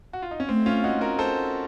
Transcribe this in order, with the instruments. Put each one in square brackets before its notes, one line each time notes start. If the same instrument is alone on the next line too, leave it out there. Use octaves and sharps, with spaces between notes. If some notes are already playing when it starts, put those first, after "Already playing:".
[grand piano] F#4
F4
D#4
C#4
[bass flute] A3 [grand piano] C4
[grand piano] C#4 F4
D#4 F#4
F#4 A#4
A4 C5